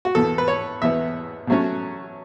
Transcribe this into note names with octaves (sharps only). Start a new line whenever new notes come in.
F#4
E2 B2 B3 A4
B4
C#5
E2 B2 B3 E5
B2 F#3 A3 C#4